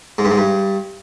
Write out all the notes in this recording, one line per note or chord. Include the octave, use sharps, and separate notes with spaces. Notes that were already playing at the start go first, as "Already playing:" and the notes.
G#2
G2
G#2
G2